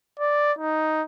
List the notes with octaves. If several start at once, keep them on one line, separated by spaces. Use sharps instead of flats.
D5
D#4